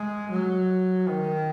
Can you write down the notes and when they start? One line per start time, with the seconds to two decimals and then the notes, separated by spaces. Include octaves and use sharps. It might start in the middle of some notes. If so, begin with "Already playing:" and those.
Already playing: G#3
0.30 F#3
1.08 D#3